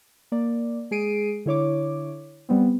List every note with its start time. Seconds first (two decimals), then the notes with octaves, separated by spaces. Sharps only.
0.32 A#3 D5
0.91 G#3 G#4 C7 D7 D#7
1.46 D3 E4 C#5 D6
2.49 G3 B3 C4